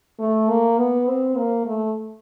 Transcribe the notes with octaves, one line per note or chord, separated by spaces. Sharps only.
A3
A#3
B3
C4
A#3
A3